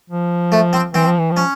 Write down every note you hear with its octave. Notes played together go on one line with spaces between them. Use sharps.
F3
A3
C4
E3 C4
F3
E3
F3
C#4